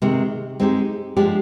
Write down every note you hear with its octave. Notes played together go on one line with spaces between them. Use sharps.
C3 D#3 G#3
G#3 C4 D#4 G4
F3 G#3 D4 G4